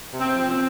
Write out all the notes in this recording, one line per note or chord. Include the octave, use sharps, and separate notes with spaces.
C3
C4
F3
C4